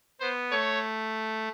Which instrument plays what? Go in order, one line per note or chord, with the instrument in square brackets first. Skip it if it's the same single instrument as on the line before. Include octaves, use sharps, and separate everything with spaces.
[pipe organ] B3 [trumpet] C5
[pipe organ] A3 [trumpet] C#5